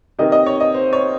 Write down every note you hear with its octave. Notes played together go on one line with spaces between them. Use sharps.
C3 D#3 A#3 D#5
D#5
C#5
D#5
C5
C#5